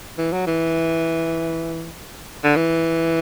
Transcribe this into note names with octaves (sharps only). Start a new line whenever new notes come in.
E3
F#3
E3
D3
E3